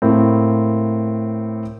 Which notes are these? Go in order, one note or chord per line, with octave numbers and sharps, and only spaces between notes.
A2 A#3 C4